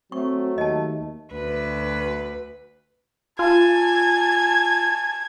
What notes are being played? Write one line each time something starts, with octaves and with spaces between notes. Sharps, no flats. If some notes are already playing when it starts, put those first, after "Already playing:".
F#3 A3 C4 C#6
D#2 D#5 A5
D2 B4
F4 G#5 A5 G#6